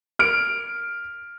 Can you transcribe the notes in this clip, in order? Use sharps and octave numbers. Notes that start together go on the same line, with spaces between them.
F6 D7